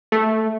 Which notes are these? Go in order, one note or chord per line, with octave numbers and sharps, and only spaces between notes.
A3